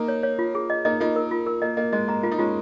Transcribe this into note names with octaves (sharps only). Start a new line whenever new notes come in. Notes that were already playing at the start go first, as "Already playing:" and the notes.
Already playing: A#3 D#4
C#5
C#5
F4
G#4
D#5
A#3 D#4 D#5
A#3 D#4 F4
A#4
F4
A#4
A#3 D#5
A#3 D#5
G#3 D#5
A#3 A#5
A#3 F4
D#4
G#3 C#4 F4